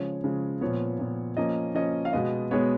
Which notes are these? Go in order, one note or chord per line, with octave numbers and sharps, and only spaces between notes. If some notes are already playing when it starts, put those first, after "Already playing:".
Already playing: C#3 F3 G#3 C#5
C#3 F3 G#3
A#2 F3 B3 C#5
A#2 F3 B3
F3 A#3 C#4 D#5
F3 A#3 C#4 D#5
F5
B2 G#3 B3 D#5
B2 G#3 B3 C#5